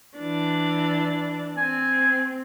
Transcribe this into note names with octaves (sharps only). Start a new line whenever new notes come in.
E3 D4
C4 G#5